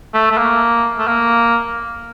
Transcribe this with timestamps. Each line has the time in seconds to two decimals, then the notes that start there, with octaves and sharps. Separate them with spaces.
0.14 A3
0.31 A3
0.38 A#3
0.98 A3
1.07 A#3